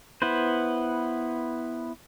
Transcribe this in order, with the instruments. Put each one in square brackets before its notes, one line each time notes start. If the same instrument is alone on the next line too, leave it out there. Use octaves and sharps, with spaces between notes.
[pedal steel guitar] B3 E4 B4 C5